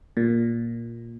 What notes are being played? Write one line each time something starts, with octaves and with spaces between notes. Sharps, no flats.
A#2